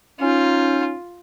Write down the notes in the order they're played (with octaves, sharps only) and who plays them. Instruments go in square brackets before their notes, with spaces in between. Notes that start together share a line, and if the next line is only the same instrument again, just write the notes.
[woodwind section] C#4 D#4 [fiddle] F4